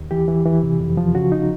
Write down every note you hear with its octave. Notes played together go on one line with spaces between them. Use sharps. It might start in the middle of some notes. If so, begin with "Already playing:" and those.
Already playing: D#2
E3 G4
E3
E3
C3
F2
F3
C#3 F#4
D#4